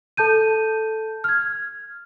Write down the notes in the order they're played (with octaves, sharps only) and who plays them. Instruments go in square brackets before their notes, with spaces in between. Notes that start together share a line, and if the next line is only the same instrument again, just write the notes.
[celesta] A4 A5 G6 D#7
F6 G#6